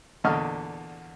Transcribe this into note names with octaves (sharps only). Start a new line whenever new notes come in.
E2 A#2 D3 D#5 C#6 F6